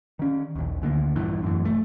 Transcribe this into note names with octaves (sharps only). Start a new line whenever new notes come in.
D#3 C#4
A#1 D#2
D2 D3 A3 A#3
A#1 E2 G2 E3
F#2 A2 E3
F1 A3